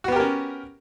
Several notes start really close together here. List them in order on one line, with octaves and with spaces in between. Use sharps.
F#4 B3 G4 A#4 C#4